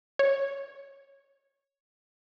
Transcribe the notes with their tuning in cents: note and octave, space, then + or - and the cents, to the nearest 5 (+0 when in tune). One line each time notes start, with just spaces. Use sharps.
C#5 +5